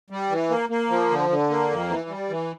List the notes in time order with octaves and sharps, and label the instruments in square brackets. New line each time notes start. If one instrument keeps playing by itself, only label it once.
[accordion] G3
E3
A#3
A#3
F3
D3
D3
A#3
F2
E3
G3
E3